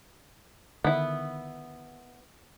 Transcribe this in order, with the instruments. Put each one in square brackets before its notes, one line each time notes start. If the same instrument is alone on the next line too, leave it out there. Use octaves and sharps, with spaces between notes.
[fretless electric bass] D3 D#3 [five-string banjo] B3 E4